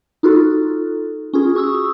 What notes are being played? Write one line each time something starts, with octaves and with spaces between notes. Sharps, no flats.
D#4 F4 F#4 A4
C#4 F4 G#4
F#4 C#6 D#6 E6